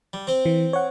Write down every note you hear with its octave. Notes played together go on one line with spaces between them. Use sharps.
G3
C4 C5
E3
C#5 F#5